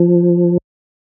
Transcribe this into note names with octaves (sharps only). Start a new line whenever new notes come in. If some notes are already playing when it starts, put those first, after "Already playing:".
Already playing: F3